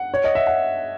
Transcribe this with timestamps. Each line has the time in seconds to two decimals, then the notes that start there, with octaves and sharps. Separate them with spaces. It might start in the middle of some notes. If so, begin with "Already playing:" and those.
Already playing: F#5
0.14 C#5
0.24 D#5
0.35 E5
0.47 F#5